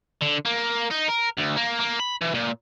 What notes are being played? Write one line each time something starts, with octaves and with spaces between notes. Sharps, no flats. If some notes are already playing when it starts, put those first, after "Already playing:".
D3
A#3
D#4
A#4
D2
A#3
A#3
B5
E3
A#2